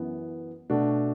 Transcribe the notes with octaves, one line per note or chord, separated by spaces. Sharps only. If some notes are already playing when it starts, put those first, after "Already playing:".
Already playing: F#2 E3 B3
B2 A3 D4 F#4